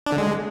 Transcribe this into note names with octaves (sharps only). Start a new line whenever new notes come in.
D4
D3
G#3